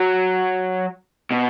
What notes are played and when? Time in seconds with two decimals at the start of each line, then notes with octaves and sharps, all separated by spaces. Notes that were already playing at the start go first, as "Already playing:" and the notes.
Already playing: F#3
1.32 B2